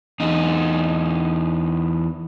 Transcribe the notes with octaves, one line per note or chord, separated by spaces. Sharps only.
E2 D#4